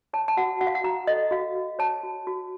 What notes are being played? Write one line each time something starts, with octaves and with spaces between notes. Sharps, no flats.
C#5 A5
A5
F#4 F#5
F#4 F#5
F5
F#5
F#4 A#5
A4 D#5
F#4 F5
F#4
C#5 A5
F#4
F#4